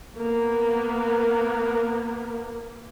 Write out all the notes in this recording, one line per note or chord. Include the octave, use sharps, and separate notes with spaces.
A#3 B3